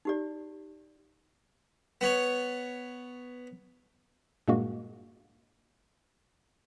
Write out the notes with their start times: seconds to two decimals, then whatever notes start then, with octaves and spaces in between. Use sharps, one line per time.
0.05 D#4 G4 D5
2.01 B3 C#5
4.48 G2 A#2 G#3 A#3 F#4